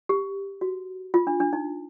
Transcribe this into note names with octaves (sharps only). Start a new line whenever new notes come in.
G4
F#4
F4
D4
D4
D#4